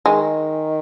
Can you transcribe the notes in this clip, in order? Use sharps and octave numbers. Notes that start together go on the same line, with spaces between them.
D#3 G#3